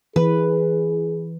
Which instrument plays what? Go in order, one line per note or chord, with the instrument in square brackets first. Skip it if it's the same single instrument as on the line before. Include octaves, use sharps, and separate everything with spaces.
[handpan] E3 [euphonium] G#4 [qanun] B4